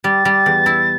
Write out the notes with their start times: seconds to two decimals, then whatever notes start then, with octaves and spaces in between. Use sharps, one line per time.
0.04 G3 A6
0.25 G3
0.46 E2
0.66 E4